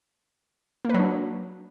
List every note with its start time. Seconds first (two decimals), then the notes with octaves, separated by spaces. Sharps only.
0.85 A#3
0.89 B4
0.94 F#3
0.99 D4